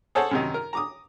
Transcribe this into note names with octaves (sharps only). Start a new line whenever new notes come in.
G#4 A4 C5 C#5 F#5 A5
F#2 C3 D#3
A#4
A#5 D6 D#6